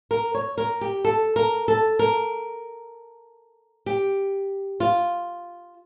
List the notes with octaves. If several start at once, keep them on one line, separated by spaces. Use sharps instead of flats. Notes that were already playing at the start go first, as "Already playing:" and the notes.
A#4
C#5
A#4
G4
A4
A#4
A4
A#4
G4
F4